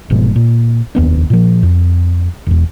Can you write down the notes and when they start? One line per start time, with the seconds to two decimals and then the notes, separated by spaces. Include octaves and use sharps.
0.10 F1 F2 G#2 B2
0.36 A#2
0.95 F1 D#2 B3 D4
1.30 A#2 F3
1.63 F2
2.47 E1 E2